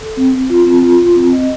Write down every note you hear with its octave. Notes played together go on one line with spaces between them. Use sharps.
A4
C4
C4
F4
C4
F4
F4
C4
D#5